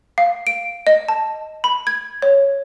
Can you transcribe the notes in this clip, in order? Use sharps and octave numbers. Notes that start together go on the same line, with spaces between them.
F5
D7
D#5
A5
B5
G#6
C#5